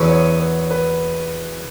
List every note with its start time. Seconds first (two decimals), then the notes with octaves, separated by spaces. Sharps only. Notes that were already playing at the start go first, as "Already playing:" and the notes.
Already playing: E2 B2 F#3 C#4 E4 B4
0.10 C#5
0.40 B4
0.71 B4